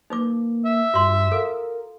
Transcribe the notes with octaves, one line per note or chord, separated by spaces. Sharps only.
A#3 D#4 B4 D6
E5
G2 F4 F#4 C6
A4 A#4 F5